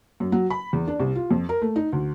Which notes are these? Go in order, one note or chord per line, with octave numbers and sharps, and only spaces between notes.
F#2
F#3
B5
E2
D4
C2
F4
F2
A#4
A3
D#4
D2